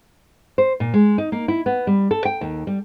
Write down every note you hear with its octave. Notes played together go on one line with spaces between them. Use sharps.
C5
A#2
G#3
D#4
A#3
E4
B3
G3
A4
G5
D#2
G3